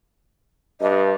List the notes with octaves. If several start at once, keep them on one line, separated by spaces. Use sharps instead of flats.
G2 D#5